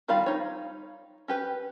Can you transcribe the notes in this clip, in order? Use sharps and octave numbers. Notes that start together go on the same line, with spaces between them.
D#3 G3 F4 F5 B5
D#4 C#5
C#4 G4 B4